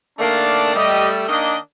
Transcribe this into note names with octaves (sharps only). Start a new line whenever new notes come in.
D#3 A3 A#3 D4 D5 A5
G3 A3 G4 D#5
D#3 A#3 D4 D#5